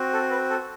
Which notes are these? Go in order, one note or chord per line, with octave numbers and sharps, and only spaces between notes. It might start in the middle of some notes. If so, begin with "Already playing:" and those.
Already playing: C4 F#4
A4
B4
A4